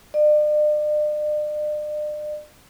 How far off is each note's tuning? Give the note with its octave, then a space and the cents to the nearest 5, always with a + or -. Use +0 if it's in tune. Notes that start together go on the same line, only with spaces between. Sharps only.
D5 +40